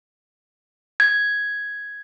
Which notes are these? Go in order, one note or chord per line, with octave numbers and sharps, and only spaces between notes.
G#6